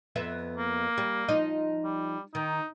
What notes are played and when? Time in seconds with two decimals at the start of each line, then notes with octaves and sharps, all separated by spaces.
0.16 F2 B3 E5
0.58 A#3
0.98 G3
1.29 F3 D#4 D#5
1.84 G3
2.35 D#3 D#4